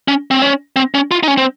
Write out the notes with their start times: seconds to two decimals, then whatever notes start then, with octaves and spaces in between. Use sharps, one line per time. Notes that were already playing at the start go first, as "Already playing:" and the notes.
0.08 C#4
0.31 C4
0.42 C#4
0.76 C4
0.94 C#4
1.11 F4
1.23 D#4
1.28 C#4
1.37 C4